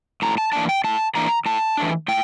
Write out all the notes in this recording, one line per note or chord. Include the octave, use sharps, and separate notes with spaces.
A2 A#5
A5
E3 A#3 D4 A5
G5
A2 A5
E3 A#3 D4 A#5
A2 A5
E3 A3 D4
A2 G5